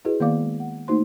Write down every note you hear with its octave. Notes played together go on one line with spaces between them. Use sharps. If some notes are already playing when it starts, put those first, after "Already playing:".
E4 F#4 G#4 B4 D#5
D#3 A#3 B3 D5 F5 D6
G#3
F#5
A3 A#3 D#4 F#4 C5 C6